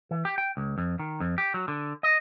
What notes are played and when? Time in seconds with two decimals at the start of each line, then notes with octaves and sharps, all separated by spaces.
0.11 E3
0.25 G4
0.38 G5
0.57 C#2
0.78 F2
0.99 D#3
1.20 F2
1.38 G4
1.54 F#3
1.68 D3
2.03 D#5